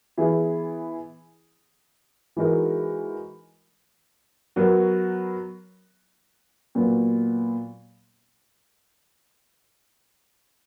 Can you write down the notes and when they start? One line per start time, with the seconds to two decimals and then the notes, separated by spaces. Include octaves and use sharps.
0.17 E3 B3 E4 G#4
2.37 E3 G#3 D#4 F#4 A#4
4.56 F#3 B3 F#4 A#4
6.75 A#2 F#3 B3